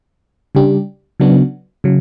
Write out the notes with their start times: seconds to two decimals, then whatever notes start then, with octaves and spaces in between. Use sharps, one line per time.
0.55 C#3 G3 D4 G4
1.20 C#3 F#3 B3 D4 F#4
1.84 C#3 F#3